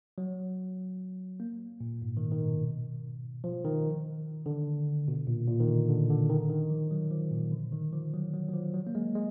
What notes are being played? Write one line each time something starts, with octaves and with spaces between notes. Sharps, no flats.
F#3
A#3
A#2
G#2
D#3
D#3
B2
F3
D#3
D3
B2
A#2
A#2
D#3
D3
D3
D3
D#3
D#3
F3
F#3
F3
A#2
D3
D#3
F3
F#3
F#3
F#3
F3
F#3
A#3
G#3
G#3